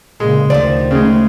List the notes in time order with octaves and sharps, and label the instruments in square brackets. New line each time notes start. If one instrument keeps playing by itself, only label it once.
[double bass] A#2 C#3 [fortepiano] G#3
[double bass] D2 [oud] D#3 F3 [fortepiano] D5
[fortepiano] C#3 G#3 [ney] A3